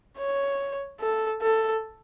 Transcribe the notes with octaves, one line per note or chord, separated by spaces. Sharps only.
C#5
A4
A4